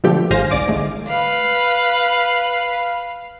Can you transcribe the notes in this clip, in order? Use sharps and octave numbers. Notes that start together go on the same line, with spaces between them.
B2 D3 F3 A3 G4
G#1 G#2 C5 F5 G#5 A#6
C2 D5 G#5 D6 D7
A1 D3 G#3 A3
B4 F5